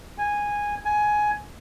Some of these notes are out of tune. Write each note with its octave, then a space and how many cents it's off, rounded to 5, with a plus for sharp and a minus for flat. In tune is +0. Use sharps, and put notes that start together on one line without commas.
G#5 -10
G#5 +15